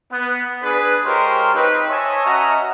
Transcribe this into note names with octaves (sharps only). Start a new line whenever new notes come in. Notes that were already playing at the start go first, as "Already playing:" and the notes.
B3
D4 G#4 B4
G#3 F4 G4 A#4 C5 C#5
C4 D#4 B4
C#5 D#5 E5 G#5 A5 C#6
C#4 F#4 D#5 E5 F#5 A#5